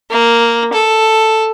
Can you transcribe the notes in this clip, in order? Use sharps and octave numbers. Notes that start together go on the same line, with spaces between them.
A#3
A4